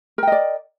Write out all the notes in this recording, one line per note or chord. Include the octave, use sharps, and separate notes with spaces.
A#4 D5 D#5 G5